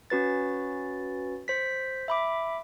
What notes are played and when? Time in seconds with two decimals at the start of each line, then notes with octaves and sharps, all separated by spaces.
0.10 C#4 F#4 B4 A6
1.48 C5 B6
2.08 E5 B5 D6